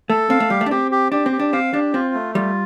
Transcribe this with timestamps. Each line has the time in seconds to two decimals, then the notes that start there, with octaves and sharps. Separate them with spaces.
0.10 A3 A4
0.30 C4 F5
0.40 A3
0.50 G3 G4
0.61 A3
0.66 D4
0.71 C4 G4
0.91 G4
1.12 D4 G4
1.26 C4
1.32 G4
1.39 D4
1.53 C4 F5
1.73 D4 G4
1.94 C4 F4
2.14 A3
2.35 G3 F4